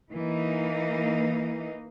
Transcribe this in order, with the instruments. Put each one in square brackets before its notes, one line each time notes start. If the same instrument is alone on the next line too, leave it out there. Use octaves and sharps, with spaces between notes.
[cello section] E3 A#3 D#4